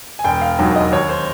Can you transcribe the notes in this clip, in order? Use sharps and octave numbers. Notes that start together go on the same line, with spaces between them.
G#5
E1 G5
F5
D#2 D#3 F#3
D#5
D#2 C#5
C5